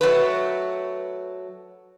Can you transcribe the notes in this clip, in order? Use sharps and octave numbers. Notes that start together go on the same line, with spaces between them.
F#3 A3 B4